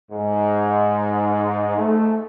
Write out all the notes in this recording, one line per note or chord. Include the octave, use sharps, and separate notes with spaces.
G#2
A3